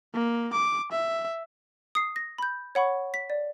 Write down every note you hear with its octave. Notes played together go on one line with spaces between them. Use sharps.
A#3
D6
E5
D#6 C7
A#6
B5 G6
C#5 F#5 B5 C#6
B6
D5